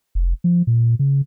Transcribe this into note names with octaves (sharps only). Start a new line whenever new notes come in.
F1
F3
A#2
C#3